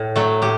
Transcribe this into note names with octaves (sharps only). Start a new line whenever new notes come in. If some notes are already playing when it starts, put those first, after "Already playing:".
Already playing: A2
F#3 A3
A2 G4